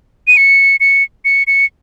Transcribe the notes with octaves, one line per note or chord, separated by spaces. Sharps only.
D#7
C#7
C#7
C#7
C#7